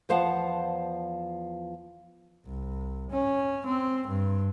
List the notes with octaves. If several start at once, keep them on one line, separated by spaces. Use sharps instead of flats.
E2 F3 C5 F5 F#5 A5
C2
C#4
C4
G2